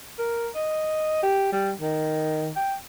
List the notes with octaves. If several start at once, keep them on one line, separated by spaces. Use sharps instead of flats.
A#4
D#5
G4
G3
D#3
G5